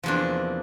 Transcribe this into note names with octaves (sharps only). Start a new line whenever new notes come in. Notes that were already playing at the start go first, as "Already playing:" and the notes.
E2 C3 F3 A#3 D4